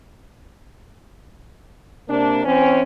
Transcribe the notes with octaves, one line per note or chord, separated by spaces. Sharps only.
C3 A#3 D4
E3 C4 C#4